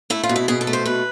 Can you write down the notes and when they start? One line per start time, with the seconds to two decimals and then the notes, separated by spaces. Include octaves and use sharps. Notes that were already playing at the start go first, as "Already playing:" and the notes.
0.10 A3 E4
0.23 F4
0.29 B2
0.36 E4
0.48 B2 G#4
0.61 A4
0.67 A3
0.73 C5
0.86 B2 B4